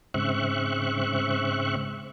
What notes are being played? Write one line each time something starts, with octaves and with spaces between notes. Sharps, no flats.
G#2 C#3 C4 E5 C#6 F#6